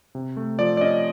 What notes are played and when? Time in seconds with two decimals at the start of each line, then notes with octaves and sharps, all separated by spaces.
0.15 C3
0.37 A3
0.59 F3 D5
0.77 D5
0.81 C#4 D#5